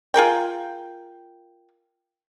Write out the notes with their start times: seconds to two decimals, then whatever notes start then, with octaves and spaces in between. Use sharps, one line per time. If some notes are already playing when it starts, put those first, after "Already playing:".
0.14 F4 G#4 A#4 G5